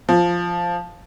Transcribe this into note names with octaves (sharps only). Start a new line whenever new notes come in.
F3